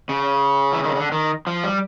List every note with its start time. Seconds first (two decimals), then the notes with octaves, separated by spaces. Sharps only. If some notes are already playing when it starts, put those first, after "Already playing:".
0.09 C#3
0.73 E3
0.84 D#3
0.95 D3
1.12 D#3
1.47 F3
1.64 G3